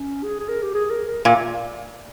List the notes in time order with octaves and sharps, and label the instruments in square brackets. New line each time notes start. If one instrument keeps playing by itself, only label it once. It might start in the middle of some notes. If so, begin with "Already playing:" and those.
Already playing: [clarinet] C#4
G#4
G#4
A#4
G4
G#4
A#4
A#4
[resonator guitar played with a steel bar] A#2 [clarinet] A#4